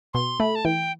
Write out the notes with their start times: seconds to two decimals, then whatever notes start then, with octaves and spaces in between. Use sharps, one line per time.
0.14 B2 C6
0.40 A3 B5
0.55 A5
0.65 E3 G5